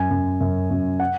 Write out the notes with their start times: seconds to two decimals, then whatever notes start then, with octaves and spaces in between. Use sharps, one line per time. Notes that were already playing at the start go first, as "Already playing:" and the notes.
Already playing: F#2 G#5
0.10 F#2
0.41 F#2
0.71 F#2
1.00 F#5